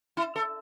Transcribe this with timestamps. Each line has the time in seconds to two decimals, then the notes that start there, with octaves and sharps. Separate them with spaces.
0.17 E4
0.36 A4